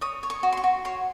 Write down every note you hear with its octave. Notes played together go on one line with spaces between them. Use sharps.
C#5 D#6
C#5
C#6
F#4
C6
C#6
F#4
C#5 C6